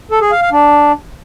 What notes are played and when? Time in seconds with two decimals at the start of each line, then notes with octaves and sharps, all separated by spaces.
0.11 A4
0.21 G#4
0.32 F5
0.42 F5
0.52 D4